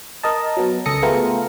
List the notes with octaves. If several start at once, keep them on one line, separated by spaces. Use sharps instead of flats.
A#4 D#5 A5
F#3 B3
C#2 A4 D#6 A#6 C#7
A3 B3 F4 G#4 A#4